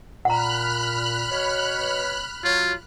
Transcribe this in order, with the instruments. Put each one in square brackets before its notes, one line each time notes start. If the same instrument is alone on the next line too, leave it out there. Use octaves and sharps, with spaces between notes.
[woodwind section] A#2 [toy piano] F#5 A#5 [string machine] B5 F6 F#6
[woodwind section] B2 C#5
[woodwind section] F#3 C#5 [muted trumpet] F4